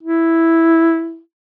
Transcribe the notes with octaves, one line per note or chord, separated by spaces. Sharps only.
E4